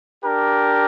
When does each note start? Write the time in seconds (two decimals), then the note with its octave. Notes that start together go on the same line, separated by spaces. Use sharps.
0.24 D4 G4 A#4